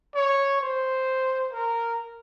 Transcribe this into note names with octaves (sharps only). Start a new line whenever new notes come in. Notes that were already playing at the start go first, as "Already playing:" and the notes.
C#5
C5
A#4